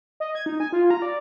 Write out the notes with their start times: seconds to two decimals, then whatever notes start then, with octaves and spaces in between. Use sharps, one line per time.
0.20 D#5
0.35 G#6
0.46 D#4
0.60 G#5
0.73 F4
0.91 A#5
1.02 D5